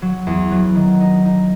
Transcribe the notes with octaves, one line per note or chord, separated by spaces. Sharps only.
F#3
E2
F#3
D#3
D#4
D#4